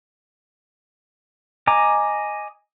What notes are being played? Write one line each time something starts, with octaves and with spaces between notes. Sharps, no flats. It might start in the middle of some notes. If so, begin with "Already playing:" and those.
D#5 G#5 A#5 D6